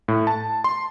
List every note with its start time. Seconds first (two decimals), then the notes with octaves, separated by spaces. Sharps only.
0.08 A2
0.27 A5
0.64 C6